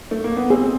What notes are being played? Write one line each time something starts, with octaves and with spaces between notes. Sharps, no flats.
A3
A#3
B3
C4 G#4